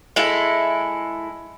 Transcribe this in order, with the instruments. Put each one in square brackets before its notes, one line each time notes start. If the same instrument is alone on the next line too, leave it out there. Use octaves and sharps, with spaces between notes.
[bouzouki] G#3 E4 A4